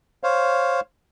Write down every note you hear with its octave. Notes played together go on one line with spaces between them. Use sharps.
C5 C#5 F5